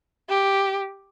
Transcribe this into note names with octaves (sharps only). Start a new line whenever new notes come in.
G4